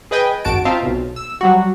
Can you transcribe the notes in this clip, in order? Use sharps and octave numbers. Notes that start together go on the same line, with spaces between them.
G#4 B4 D#5 G5 G#5
G#1 F#2 F#4 A5 D7
C4 D#4 F4 E5 F5 A5
B1 B2
E6
F#3 G3 F#4